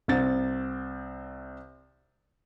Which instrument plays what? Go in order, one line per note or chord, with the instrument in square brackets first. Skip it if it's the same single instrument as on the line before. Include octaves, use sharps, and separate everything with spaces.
[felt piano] C2 C4 A6